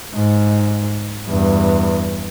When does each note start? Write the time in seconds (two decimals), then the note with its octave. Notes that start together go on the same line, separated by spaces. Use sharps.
0.15 G#2
1.28 E2 G2